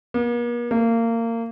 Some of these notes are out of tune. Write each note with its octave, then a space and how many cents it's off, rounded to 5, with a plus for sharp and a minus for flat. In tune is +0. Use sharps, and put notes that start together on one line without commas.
A#3 +45
A#3 -25